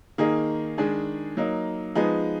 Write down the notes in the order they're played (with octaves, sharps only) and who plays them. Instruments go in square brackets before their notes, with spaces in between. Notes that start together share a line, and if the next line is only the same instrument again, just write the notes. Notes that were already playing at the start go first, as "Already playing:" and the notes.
[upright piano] D#3 A#3 D#4 G#4
D#3 G#3 D4 G#4
F#3 A#3 D#4
F3 G#3 B3 D#4 G#4